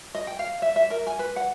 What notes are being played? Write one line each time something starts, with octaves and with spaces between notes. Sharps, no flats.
D#5
G5
F5
E5
E5
A#4
G#5
B4
F#5